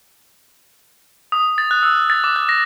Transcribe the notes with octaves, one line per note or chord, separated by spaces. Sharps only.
D#6
A6
F#6
E6
A6
D6
F#6
A#6